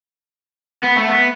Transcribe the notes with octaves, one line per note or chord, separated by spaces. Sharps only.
B3
A3
B3